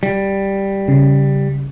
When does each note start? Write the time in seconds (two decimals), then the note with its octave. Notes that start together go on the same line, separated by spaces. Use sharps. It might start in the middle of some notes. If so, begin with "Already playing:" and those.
0.03 G3
0.88 C#3